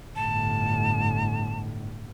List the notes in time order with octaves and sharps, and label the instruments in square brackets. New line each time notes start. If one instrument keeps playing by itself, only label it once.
[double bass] G1 A2 [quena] A5